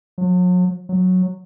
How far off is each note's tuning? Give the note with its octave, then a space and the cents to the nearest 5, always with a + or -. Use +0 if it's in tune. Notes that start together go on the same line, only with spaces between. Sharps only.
F#3 -40
F#3 -10